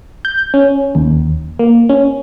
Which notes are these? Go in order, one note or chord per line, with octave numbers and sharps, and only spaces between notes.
G6
C#4
D#2
A#3
C#4